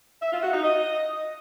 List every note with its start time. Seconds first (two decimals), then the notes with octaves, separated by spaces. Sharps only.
0.22 E5
0.32 F4
0.43 F#4
0.53 D#4
0.64 D#5